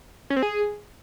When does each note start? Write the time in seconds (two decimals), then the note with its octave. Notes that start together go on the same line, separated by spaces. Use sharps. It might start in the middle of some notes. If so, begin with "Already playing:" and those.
0.30 C#4
0.36 C4
0.43 G#4